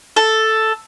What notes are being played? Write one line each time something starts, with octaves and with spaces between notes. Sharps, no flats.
A4